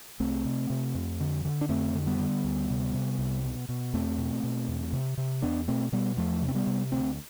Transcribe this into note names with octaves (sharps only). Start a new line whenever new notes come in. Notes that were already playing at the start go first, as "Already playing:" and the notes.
C2 A3 C4
C3
C3
F2
D3
D3
D4
F2 A3 C4
D3
G3 B3
D3
D2
C3
C3
C2
B2
B2
E2 A3 C4
B2
B2
E2
C3
C3
E2 B3 D4
B2 A3 C4
B2 G3 B3
E2 F3 A3
C3
C4
G3 B3
C3
D2 A3 C4